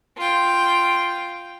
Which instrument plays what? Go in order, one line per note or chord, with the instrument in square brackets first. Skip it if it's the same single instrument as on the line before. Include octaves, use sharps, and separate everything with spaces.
[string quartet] F4 G5